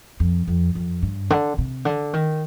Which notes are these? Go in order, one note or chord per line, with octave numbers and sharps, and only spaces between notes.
F2
F2
F2
G2
D3
C3
D3
D#3